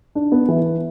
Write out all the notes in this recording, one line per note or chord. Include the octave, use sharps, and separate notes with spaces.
D4
B3
E3